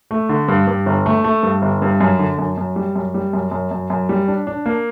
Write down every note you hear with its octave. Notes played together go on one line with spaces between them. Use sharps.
A3
D3
G2
G2
G1
A3
A3
G2
G1
G2
F#2
D3
F#2
F#2
G3
F#2
G3
F#2
F#2
F#2
F#2
G3
D4
D4
A#3